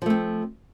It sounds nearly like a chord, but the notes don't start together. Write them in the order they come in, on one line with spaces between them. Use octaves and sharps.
F3 A3 C4